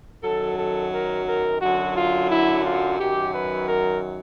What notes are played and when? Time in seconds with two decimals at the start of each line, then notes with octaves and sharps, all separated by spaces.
0.23 F#2 D#3 F#3 A4
0.57 A4
0.93 A#4
1.26 A#4
1.61 F#2 D3 F#3 F#4
1.96 F4
2.30 E4
2.65 F4
2.99 F#2 D#3 F#3 G4
3.34 B4
3.69 A#4